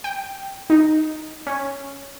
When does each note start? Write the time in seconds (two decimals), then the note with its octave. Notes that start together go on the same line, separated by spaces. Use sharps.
0.04 G5
0.70 D#4
1.47 C#4